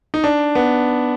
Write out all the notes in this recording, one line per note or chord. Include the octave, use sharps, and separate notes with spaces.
D#4
D4
B3